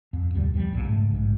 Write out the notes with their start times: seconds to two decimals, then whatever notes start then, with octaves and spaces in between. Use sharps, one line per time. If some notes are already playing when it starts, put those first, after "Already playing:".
0.13 F2
0.34 D2 G2 C3 G3
0.54 E2 F3 G3
0.72 B1 F2 A#2
0.84 G#2 C#3 A3
1.11 A#1 G#2